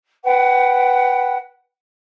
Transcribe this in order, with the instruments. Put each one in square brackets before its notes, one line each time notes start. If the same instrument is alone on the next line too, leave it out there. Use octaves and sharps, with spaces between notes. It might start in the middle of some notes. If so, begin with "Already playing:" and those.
[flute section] B4 F#5 G5